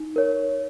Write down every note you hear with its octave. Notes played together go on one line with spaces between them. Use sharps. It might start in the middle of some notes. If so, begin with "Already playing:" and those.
Already playing: D#4
A#4 C#5